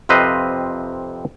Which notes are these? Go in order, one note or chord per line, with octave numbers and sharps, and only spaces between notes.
F2 C3 C4 B4 D#5 F5